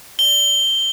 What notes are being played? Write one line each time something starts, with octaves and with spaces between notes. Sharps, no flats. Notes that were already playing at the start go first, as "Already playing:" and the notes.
G7